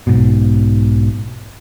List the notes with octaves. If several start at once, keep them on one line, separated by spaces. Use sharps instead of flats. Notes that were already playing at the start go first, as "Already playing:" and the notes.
B1 G#2 B2